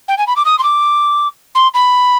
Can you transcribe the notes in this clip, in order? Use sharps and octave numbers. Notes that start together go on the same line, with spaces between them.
G5
G#5
B5
D6
D#6
C6
D6
C6
B5